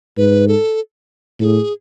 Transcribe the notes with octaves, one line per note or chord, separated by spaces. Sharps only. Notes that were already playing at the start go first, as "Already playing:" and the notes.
G#2 B4
A4
A2 G#4 A4